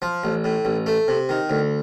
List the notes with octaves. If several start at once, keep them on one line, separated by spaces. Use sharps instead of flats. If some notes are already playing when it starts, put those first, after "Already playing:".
F3
A1
A2
A1
A3
C3
D#3
D2